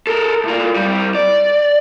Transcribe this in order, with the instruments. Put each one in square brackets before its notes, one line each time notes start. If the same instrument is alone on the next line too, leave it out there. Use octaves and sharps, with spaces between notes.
[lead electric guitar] A4 A#4
A2 F4
C2 G3
D5